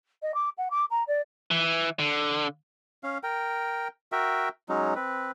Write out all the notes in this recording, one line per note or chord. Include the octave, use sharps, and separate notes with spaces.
D#5
D6
F#5
D6
A#5
D5
E3
D3
C#4 F5
A#4 G5
F#4 A#4 E5 G5
F#3 G#3 C#4 D#4
C4 B4